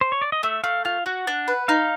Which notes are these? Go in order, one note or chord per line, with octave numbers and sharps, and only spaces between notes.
C5
C#5
D5
D#5
A3 E5
A3 F5
F4 F5
F#4 F#5
D4
B4
D#4 F5